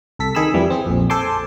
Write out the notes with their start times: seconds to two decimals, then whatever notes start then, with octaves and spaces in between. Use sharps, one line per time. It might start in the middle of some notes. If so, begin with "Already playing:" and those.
0.19 C2 A4 B6
0.35 D#3 G#4 B5 E6
0.54 F2 E3 G3
0.70 C4 G#4
0.86 A#1 F2
1.10 A4 C5 G#5 A5 C6 D6